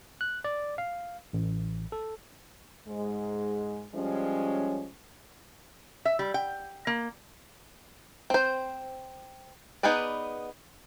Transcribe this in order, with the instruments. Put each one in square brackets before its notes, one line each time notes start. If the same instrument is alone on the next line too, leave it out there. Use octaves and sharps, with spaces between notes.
[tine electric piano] F#6
D5
F5
A1
A4
[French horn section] G#2 G#3
F3 G3 G#3 C#4
[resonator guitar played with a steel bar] E5
G3
G5
A#3
[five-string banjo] C4 C5
B3 D#4 G#4 B4 D5